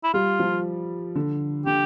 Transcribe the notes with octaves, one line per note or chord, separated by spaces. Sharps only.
E4
G3 F4
F3
D3
D3 G4